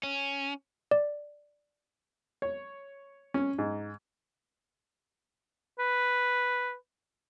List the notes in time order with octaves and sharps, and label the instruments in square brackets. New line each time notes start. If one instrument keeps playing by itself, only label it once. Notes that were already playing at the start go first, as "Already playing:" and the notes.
[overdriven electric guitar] C#4
[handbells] D5
[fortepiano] C#5
C#4
G#2
[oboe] B4